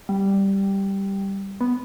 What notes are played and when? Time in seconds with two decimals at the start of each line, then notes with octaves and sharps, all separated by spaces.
0.09 G3
1.61 B3